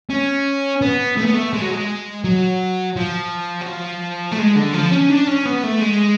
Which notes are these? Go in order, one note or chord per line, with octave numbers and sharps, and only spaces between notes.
C#4
B3
A3
B3
A3
G#3
F#3
G#3
F#3
F3
F#3
F3
A3
G#3
D3
F3
C#4
D4
C#4
B3
A3
G#3